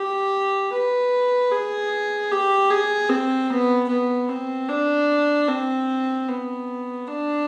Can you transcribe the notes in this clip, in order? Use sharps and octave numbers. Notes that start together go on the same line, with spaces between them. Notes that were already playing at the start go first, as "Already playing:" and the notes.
Already playing: G4
B4
G#4
G4
G#4
C4
B3
B3
C4
D4
C4
B3
D4